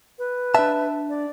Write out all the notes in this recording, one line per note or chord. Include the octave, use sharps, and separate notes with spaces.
B4
D4 E5 A5
D5